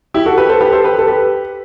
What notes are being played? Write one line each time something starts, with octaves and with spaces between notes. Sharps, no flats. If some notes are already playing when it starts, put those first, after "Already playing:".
E4 G4
F#4 A4
G4 B4
A4 C5
G4 B4
A4 C5
G4 B4
A4
G4 B4